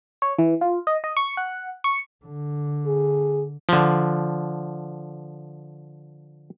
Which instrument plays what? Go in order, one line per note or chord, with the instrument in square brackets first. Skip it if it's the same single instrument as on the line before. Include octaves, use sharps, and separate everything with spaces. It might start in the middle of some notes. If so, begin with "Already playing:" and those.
[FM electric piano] C#5
E3
F4
D#5
D#5
C#6
F#5
C#6
[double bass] D3
[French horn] G#4
[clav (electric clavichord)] D3 F3